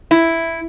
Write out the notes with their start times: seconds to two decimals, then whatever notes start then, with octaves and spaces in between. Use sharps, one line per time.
0.11 E4